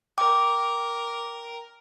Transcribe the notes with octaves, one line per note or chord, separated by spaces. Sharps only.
A#4 G5 D6